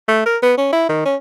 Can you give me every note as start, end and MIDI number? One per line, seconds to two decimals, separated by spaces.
0.08 0.26 57
0.26 0.37 70
0.42 0.53 59
0.58 0.71 61
0.72 0.87 64
0.89 1.05 51
1.05 1.16 61